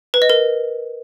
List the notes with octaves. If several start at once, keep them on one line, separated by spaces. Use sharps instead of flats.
B4
D#5
A#4